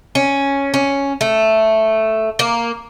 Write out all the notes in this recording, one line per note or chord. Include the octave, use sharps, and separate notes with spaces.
C#4
C#4
A3
A#3